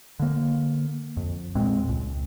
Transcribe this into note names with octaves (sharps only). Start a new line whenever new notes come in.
D3 A#3
F2
E2 A#2 G#3 C4
C#2